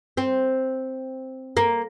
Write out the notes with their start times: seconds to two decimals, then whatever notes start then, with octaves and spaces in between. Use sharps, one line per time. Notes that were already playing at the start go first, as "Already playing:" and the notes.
0.17 C4
1.57 A#3